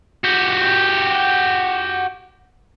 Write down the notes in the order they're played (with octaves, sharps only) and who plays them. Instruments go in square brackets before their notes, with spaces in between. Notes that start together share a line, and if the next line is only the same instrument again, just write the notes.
[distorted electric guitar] F#4 G4